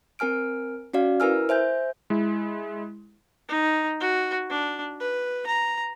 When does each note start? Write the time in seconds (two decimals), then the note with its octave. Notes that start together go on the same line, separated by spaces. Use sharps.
0.19 C4 A#4 G#5 F6 D7
0.93 C#4 F#4 D5 F5
1.20 E4 A#4 B4 G#5 E6 F6
1.49 C5 E5 G#5 G6
2.10 G#3 E4
3.49 D#4
4.00 F#4
4.50 D4
5.00 B4
5.47 A#5